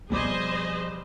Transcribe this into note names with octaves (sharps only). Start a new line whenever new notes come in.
F2 B2 F3 G3 G#4 C5 D#5 D6